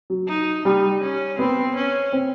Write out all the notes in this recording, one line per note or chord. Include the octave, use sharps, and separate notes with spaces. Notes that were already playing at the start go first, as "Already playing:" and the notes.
F#3
D#4
G3 D#4
C#4
B3 C4
C#4
C4